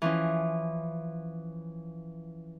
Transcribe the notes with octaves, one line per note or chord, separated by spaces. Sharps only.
E3 F3 C#4